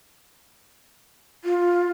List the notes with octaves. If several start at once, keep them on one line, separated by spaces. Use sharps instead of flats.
F4